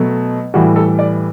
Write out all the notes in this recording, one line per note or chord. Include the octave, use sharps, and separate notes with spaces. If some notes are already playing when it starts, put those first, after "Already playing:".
Already playing: B2 F#3 A3
A2 E3 G3 F#4
A4
D5